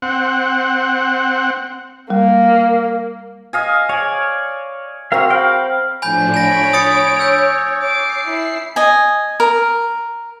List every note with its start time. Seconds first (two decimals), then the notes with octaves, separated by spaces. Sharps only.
0.02 C4 F#5
2.10 G3 A#3
3.53 D#5 F5 G#5
3.89 C#5 D5 G#5
5.12 C4 F#4 A#4 F5
5.30 F5 G5 B5
6.02 A2 F3 D4 G#5 B5 G6
6.34 C#5 G#5 B5 A#6 D7
6.73 D#6 A6 C#7
7.19 E6 G6 A6
7.82 D6 C7
8.27 E4
8.76 D#5 G#5
9.40 A#4